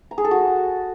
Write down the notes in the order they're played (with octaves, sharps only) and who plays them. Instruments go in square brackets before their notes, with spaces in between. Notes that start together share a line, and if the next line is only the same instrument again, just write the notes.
[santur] A#5
G#4
A4
F#4